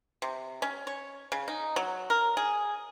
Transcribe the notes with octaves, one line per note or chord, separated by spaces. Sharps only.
C3
C#4
C#5
C#3
D#4
F#3
A#4
G#4